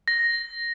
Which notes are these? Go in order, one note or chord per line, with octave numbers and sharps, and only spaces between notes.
A#6